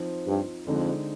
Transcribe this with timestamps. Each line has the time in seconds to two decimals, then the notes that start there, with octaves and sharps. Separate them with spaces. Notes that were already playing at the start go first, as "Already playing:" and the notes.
Already playing: F3 C4 D#4
0.26 G2
0.66 F2 D3 G#3 C4 D#4